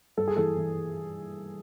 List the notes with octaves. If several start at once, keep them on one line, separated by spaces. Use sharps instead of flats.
G2 A4
G#4
E3 A4
E3